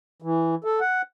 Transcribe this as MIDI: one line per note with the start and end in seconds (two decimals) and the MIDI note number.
0.22 0.55 52
0.64 0.80 69
0.81 1.02 78